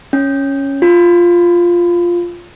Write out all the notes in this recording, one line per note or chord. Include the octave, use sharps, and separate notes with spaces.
C#4
F4